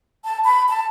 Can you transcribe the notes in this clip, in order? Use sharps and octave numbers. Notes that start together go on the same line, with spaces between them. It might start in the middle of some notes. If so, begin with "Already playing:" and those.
A5
B5
A5